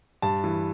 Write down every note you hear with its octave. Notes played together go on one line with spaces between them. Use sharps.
G2 A5
E3